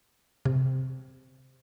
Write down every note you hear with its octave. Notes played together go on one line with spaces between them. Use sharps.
C3